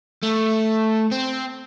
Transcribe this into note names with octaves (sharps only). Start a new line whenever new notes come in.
A3
C4